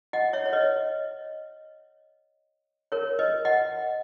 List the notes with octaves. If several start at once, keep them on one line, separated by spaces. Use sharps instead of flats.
D#5 F#5
C#5 E5
C#5
B4 D#5
A#4 C#5
B4 D#5
D#5 F#5